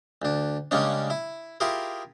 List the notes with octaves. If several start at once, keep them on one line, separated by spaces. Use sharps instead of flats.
D2 D4
C#3 G3 G#3 A#3 C#4 D4
E4
E4 F4 G4 G#4 A#4